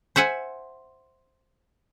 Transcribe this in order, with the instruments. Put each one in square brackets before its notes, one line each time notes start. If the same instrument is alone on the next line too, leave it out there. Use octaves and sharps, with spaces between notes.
[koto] C5 E5 F#5 G#5